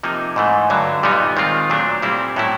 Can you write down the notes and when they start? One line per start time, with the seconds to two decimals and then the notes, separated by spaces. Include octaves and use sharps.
0.03 C3 F3 A#3 D#4
0.36 G#2 E3 A3
0.70 G2 D3 F#3
1.03 A#2 G3 B3 D#4
1.37 D#3 G#3 C4 F4
1.70 A#2 F#3 A3 D4
2.02 A#2 G3 C4 E4
2.36 A2 F#3 A3 C#4 E4